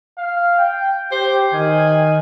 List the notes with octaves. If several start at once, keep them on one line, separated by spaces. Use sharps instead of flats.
F5
G5
G4 C5
D#3 G#5